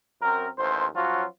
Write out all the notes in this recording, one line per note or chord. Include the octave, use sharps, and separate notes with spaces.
F#2 C4 A#4
A1 D#2 C5
F3 F#3 C#4 F4 F#4